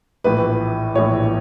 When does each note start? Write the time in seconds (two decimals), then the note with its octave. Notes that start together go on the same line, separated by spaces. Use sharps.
0.24 A#1 A2 E3 B4
0.95 A#1 A2 E3 C#5